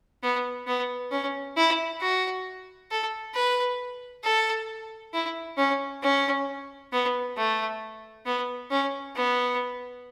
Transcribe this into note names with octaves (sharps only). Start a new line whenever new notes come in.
B3
B3
C#4
E4
F#4
A4
B4
A4
E4
C#4
C#4
B3
A3
B3
C#4
B3